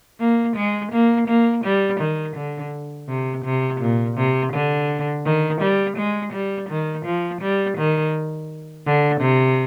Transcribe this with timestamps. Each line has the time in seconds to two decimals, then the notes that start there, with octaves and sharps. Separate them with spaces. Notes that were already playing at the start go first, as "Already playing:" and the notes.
0.20 A#3
0.56 G#3
0.92 A#3
1.28 A#3
1.65 G3
2.00 D#3
2.36 D3
3.09 C3
3.45 C3
3.81 A#2
4.17 C3
4.53 D3
5.25 D#3
5.61 G3
5.97 G#3
6.33 G3
6.69 D#3
7.06 F3
7.41 G3
7.77 D#3
8.86 D3
9.21 C3